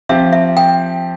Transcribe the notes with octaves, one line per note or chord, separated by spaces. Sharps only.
F3 C4 G4 E5
E5
G5